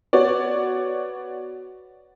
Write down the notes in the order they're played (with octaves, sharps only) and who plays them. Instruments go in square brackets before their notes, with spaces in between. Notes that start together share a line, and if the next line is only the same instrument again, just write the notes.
[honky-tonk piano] B3 F#4 C#5 D5